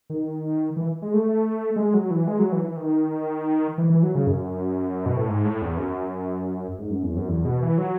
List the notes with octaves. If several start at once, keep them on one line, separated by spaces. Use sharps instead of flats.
D#3
E3
G#3
A3
G#3
F#3
E3
G#3
F#3
E3
E3
D#3
E3
E3
F#3
C#3
F#2
B2
A2
G#2
A2
E2
F#2
G#2
F#2
E2
F#2
E2
B2
E3
F#3